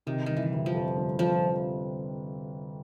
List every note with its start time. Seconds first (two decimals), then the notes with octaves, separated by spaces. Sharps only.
0.07 C3 D#3
0.26 G1 D#3
0.37 E3
0.52 G1
0.66 F3
0.75 F2
0.97 G1
1.19 F2 F3